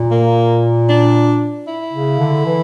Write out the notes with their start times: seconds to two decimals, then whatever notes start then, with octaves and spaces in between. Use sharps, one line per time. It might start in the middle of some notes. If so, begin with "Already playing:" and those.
Already playing: A#2
0.11 A#3
0.89 D4
1.68 E4
1.93 C#3
2.20 D3
2.46 E3